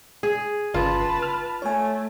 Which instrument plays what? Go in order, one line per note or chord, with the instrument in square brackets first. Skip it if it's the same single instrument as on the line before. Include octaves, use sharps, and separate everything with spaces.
[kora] G#4
[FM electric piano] G1 C#3 [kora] F4 [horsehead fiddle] B4 A5
[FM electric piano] F6
[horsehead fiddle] A3 [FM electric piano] C#5 G#5